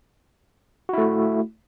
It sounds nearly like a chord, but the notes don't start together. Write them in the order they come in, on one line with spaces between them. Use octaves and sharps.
F#4 E4 A3